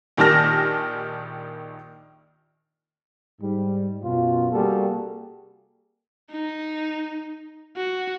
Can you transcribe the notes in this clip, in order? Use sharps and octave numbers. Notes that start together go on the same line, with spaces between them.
A#1 D#3 G4 A5 F6 A#6
G#2 G3
F#2 B2 F4
C3 G3 A#3 F#4 G#4 A4
D#4
F#4